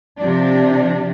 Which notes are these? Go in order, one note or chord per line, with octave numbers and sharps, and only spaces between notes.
C3 F3 D4